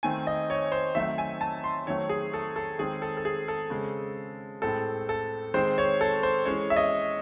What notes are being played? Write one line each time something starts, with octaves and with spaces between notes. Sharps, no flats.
D#3 A3 C4 G#5
D#5
C#5
C5
D#3 F#3 A3 C4 E5
G#5
A5
C6
D#3 F#3 A3 C4 C#5
G#4
A4
A4
D#3 G#3 C4 G#4
A4
A4
G#4
A4
C#3 G#3 C4
A2 G#3 C4 A4
A4
D#3 G#3 C4 C5
C#5
A4
C5
E3 G#3 C#4 C#5
E5
D#5